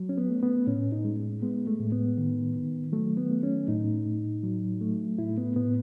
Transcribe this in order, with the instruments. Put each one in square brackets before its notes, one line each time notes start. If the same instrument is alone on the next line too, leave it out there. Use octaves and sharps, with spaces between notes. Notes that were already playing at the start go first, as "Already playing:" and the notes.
Already playing: [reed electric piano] F#3
C#4
B3
A3
B3
A2 C#4
D#4
G#3
G#3 B3
A3
A2
B3
D#3
D#3
F#3 A3
B3
A3
C#4
A2 D#4
A2
F#3
A3
A2 E4
B3
A2 B3